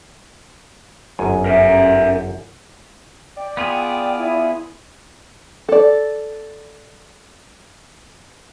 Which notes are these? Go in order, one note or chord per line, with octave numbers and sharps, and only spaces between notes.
G1 F#2 G#5
A#4 E5
D5 G5
B3 F4 G#4
E4
A4 D5